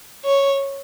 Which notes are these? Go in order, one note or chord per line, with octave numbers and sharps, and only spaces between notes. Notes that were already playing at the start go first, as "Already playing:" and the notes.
C#5